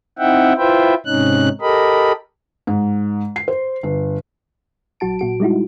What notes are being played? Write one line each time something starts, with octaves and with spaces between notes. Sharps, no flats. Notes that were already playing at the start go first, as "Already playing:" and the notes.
C4 D#4 E4 E5 F#5 G5
E4 F4 B4 C5 E5 G5
G#2 C3 C#4 D#4 F#6
G4 A4 A#4 D#5 B5
G#2
C7
C5
G1
A#1 F#3 F#4 A5 D7
A#2 F#4 D7
G3 G#3 D#4 E4 F#4